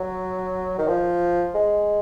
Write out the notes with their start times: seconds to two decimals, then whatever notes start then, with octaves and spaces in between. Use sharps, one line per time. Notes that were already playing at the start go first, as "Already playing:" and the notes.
Already playing: F#3
0.79 D#3
0.88 F3
1.55 G#3